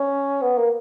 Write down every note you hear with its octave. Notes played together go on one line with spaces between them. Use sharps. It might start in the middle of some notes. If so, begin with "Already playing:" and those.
Already playing: C#4
B3
A#3